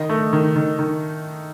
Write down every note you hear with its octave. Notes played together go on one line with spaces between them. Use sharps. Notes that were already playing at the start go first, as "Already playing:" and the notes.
Already playing: D#3 D#5
A3
D#3
D#3
D#3